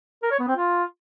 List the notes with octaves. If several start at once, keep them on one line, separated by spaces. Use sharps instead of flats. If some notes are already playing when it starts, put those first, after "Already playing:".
A#4
C#5
B3
C4
F4